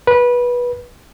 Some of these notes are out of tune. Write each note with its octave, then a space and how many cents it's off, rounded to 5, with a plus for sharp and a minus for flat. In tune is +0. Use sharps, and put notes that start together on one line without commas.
B4 -20